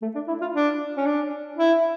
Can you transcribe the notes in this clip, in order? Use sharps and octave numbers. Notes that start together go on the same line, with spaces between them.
A3
D4
E4
F4
D4
C#4
D4
E4